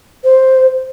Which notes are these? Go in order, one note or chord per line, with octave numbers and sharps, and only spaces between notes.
C5